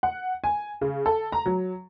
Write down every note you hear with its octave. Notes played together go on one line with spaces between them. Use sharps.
F#5
G#5
C#3
A4
A#5
F#3